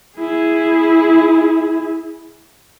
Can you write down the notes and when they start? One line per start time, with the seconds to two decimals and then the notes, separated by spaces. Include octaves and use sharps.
0.18 E4 G#4